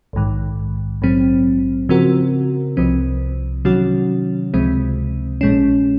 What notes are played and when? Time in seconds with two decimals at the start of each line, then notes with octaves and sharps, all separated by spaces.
0.13 A#1 G#2 D#3
1.02 A#1 G#2 F#3 C4
1.89 C#3 F3 C4 F#4 A#4
2.77 C2 C3 F3 C4
3.65 C3 D#3 F#3 C#4 F#4
4.54 C#2 C3 F3 G#3 C4
5.41 A#1 A#2 G#3 C#4